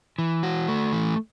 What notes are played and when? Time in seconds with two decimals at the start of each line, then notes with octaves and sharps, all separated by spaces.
0.19 E3
0.43 F#4
0.68 A3
0.93 E3